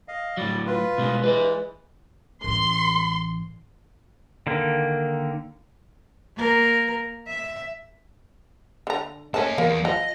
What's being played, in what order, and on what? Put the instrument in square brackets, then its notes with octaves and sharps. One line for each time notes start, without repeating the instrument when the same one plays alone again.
[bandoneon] D#5 F5
[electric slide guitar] A2 F#3 [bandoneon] G3 D5
[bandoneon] F4 B4
[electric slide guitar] B2 G3 G#3
[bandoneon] E3 G#3 [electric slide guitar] B4 C5 D5
[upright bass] A1 E3 [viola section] C6
[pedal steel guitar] D3 D#3 A#3
[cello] A#3 A#4
E5
[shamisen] D3 A#5
[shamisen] D#3 A3 C#4 [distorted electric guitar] C#5 A5
[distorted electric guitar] E2 [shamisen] A#3
[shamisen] F3 A#5 [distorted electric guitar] D#5